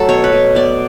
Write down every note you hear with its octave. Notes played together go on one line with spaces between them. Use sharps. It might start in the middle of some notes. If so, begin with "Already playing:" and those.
Already playing: F#3 A3 A4
B2 C#5
B4
B2
B3 D5